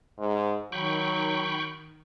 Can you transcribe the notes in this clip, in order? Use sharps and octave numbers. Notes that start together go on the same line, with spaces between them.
G#2
D#3 F#3 G5 B5 C#6